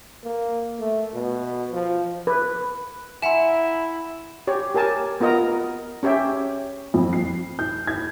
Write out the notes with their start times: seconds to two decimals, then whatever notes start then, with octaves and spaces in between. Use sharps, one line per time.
0.24 A#3
0.79 A3
1.14 B2
1.72 F3
2.27 B4
3.22 E4 E5 F#5 G#5 A#5 C6 E7
4.47 G4 C#5
4.75 G4 A#4 G#5 A5
5.21 B3 F4 A#4 D#5 A#5
6.03 C#4 G4 C#5 E5 G5
6.94 F2
7.13 C7
7.59 G6
7.87 G#6